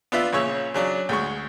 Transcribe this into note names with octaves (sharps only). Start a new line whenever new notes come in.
B3 D4 F4 B4 E5
A#1 C#3 C#5 E6
C#3 F#3 D4
D2 G#3 C#6